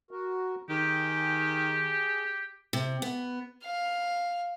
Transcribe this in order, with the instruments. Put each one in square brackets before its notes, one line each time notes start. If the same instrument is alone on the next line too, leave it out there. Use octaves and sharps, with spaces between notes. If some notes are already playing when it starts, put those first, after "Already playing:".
[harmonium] F#4 A#4
[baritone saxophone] D#3 [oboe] G4 [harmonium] G#4
[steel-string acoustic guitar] C3
B3
[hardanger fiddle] F5